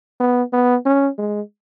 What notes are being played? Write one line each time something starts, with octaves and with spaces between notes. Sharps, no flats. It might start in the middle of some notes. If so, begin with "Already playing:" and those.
B3
B3
C#4
G#3